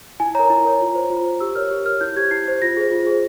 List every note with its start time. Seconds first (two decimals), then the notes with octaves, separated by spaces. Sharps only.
0.20 E4 G#5
0.35 A#4 C#5 A#5
0.50 E4
0.65 A#4 C#5
0.80 F4
0.95 C5
1.10 F4
1.26 C5
1.40 G4 E6
1.55 A#4 C#5 F6
1.71 G4
1.86 A#4 C#5 F6
2.01 E4 G6
2.16 G4 C5 G#6
2.31 E4 C7
2.47 G4 C5
2.62 F4 A#6
2.77 G#4 C5
2.92 F4
3.07 G#4 C5